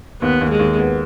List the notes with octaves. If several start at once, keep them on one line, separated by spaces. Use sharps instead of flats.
D#2 B3
D#2
G#3
D#2
B3